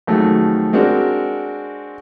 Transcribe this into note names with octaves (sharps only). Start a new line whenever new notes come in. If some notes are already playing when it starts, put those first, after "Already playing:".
F2 D#3 F#3 G#3 A3
G#3 C4 D4 F#4 A#4